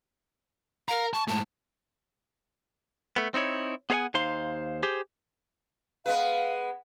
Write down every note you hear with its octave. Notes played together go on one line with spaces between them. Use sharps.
A#4 F5 A#5
A5 C#6
G#2 A3 A5
A3 B3
C4 D#4 E4 C#5
B3 G#4 C5 F5 F#5 G#5
D#2 D#4 C5 F5 C6
G4 G#4 C5
G#3 B3 B4 F5